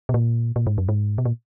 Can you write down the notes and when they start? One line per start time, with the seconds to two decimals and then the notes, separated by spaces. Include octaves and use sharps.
0.09 B2
0.14 A#2
0.56 A#2
0.67 G#2
0.78 F#2
0.89 G#2
1.18 B2
1.25 A#2